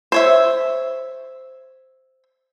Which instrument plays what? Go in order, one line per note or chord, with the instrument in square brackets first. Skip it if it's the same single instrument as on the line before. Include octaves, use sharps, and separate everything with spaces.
[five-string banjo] C5 C#5 E5